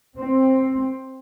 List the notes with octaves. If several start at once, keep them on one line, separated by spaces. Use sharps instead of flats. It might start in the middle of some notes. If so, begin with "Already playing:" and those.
C4